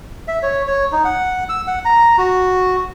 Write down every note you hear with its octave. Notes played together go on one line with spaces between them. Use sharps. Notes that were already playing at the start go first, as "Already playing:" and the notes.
E5
C#5
C#5
D#4
F#5
E6
F#5
A#5
F#4